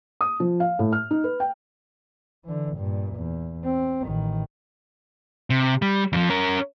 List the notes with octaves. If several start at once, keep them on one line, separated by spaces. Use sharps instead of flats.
D#6
F3
F5
A2
F6
D#4
B4
G5
D3 E3
G2 A#2
E2
C4
A1 D#3
C3
G3
F2 F3
C#4 A#4